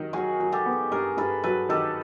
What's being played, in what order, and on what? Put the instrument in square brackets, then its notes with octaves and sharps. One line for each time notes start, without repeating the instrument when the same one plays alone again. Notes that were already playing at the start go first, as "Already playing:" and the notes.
Already playing: [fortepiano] D#3 F#3 [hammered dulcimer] A#4
[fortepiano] F#3 [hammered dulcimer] F#4 G#4
[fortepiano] F#3
[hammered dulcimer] G4 A4
[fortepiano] B3
[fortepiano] G2 [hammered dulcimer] G#4 A#4
[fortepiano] G2 [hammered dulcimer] A4 B4
[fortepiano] F#3 [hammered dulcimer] A4 B4
[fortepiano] D#3 [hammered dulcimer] G4 A4